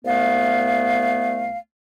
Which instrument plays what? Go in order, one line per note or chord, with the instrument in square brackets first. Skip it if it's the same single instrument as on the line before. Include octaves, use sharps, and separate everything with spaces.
[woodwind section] C2 A3 B3 F5